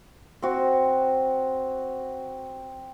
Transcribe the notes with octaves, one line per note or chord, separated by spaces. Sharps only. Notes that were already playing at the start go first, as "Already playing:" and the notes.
C4 F#4